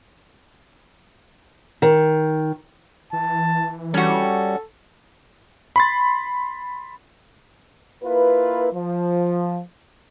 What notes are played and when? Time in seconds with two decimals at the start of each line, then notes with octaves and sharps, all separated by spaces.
1.82 D#3
3.13 E3 A5
3.94 G3 C#4 F#4 A4
5.76 B5 C6 A6
8.03 A#3 E4 F4 B4
8.73 F3